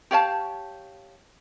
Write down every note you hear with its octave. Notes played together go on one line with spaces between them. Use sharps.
G4 C#5 F5 A5